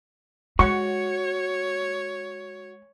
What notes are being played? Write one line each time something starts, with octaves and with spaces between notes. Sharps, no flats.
G#3 F#4 C#5 C#6